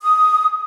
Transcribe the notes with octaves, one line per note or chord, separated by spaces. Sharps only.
D#6